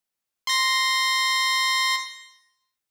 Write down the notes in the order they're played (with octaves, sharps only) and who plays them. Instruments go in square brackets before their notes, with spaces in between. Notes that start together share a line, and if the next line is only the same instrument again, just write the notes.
[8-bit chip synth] C6 A#6